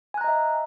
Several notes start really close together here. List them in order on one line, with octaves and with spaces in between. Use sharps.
G#5 F#6 A#5 D#5 E5